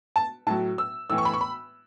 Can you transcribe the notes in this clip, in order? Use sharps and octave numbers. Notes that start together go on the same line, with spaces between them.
A5
A2 F#3 A5
E6
A2 E3 E6
C#6
B5
C#6
B5